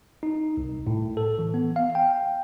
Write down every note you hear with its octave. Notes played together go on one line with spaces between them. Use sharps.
D#4
C2
A2
A4
E3
B3
F5
G5